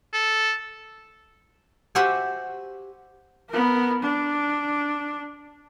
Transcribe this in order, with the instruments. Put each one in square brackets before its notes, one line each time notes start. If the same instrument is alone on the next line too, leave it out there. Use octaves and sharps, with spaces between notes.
[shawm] A4
[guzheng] F#4 G4 C5 E5 F#5 G#5
[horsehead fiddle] B3 A#4
D4